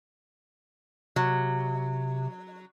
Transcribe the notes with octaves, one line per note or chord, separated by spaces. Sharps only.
C3 F#3